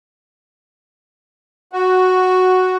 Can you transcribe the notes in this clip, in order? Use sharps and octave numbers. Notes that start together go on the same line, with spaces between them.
F#4